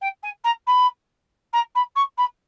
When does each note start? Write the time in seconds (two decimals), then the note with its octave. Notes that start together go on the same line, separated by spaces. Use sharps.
0.01 G5
0.23 G#5
0.44 A#5
0.67 B5
1.53 A#5
1.75 B5
1.95 C#6
2.17 B5